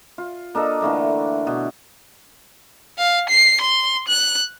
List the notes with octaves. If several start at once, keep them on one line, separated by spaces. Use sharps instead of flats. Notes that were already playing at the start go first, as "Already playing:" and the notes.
F4
A#3 D4 A4 D#5
D3 E3 A3 A#3
B2
F5
C7
C6
F#6